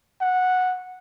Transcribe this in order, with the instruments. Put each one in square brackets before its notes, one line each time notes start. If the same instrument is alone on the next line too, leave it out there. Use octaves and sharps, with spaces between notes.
[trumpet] F#5